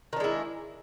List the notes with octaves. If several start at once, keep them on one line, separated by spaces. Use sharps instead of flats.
D#3 G#3 D4 E4